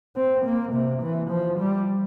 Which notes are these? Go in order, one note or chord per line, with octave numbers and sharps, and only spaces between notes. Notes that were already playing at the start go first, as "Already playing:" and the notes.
C4
A#3
C3
E3
F3
G3